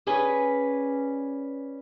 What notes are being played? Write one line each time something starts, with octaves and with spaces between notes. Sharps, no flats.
C#4 G#4 B4 D5